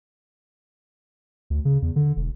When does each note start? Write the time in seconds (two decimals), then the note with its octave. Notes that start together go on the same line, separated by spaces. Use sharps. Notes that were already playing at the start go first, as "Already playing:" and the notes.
1.50 D2
1.65 C#3
1.82 E2
1.96 D3
2.17 E1